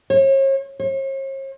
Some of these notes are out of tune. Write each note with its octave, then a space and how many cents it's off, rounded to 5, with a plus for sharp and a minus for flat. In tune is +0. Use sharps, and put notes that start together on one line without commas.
C#5 -40
C#5 -45